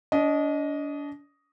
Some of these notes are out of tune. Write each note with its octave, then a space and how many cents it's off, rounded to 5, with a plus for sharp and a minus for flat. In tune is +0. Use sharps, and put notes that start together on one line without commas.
D4 -35 D#5 +0